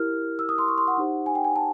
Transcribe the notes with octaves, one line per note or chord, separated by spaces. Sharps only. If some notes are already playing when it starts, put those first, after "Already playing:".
Already playing: E4 G4 A#4 F6
E6
D#6
C6
C#6
C6
F#5
D#4 G4 C5
G#5
G5
G#5
A5